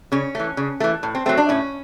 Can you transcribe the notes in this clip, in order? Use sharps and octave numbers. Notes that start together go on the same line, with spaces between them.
C#3 C#4
E3 A3
C#3
E3 A3
A2
C4
F#3 A3 C4
D4
A2 C#4